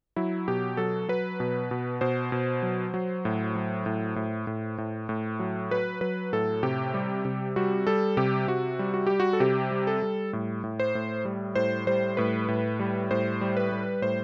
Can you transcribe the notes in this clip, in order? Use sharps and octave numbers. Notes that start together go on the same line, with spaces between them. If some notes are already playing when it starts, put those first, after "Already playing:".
F#3 E4
B2 G4
F#3 A4
F#3 B4
B2
B2
B2 C5
B2
F#3
F#3
A2
F#3
A2
A2
A2
A2
A2
F#3
F#3 B4
F#3 B4
A2 A4
C3 G4
G3
C3
G3 F#4
G3 A4
C3 G4
C3 F#4
G3
F#4
G3 G4
F#4
A4
C3 G4
G3
A4
G3
A2
A2
C5
A2
G3
A2 C5
G3 C5
A2 B4
A2
G3
A2 C5
G3
B4
G3
A2 C5